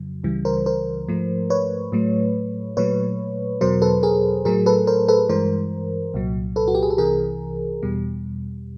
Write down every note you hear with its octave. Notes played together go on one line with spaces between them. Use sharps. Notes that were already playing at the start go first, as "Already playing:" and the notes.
Already playing: F2 C#3 F#3
C#2 C#3 E3 G3
A#4 C5
A#4 C5
G#2 F3 A3
B4 C#5
A2 F#3 A3
A#2 F#3 A3 B4 C#5
E2 B2 F#3 A#4 C5
A4 B4
G#4 A#4
A2 F#3 A3 G#4 A#4
A4 B4
A#4 C5
A4 B4
G2 E3 G#3 A#4 C5
C2 A#2 F#3
A4 B4
F#4
G4
G#4
A4
C2 C3 E3 G#4 A#4
E2 B2 G3